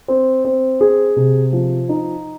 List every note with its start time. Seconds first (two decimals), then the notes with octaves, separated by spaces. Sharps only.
0.08 C4
0.45 C4
0.81 G#4
1.16 C3
1.53 F3
1.89 D#4